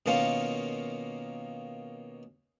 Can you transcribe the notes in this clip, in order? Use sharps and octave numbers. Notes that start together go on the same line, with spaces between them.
B2 D#3 A#3 C#4 F4